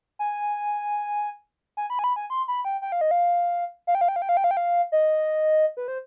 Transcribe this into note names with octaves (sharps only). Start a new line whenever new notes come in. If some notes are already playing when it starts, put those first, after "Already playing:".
G#5
G#5
B5
G#5
B5
G#5
C6
B5
G5
G5
F5
D#5
F5
F5
G5
F5
G5
F5
G5
F5
G5
F5
G5
F5
D#5
B4
C5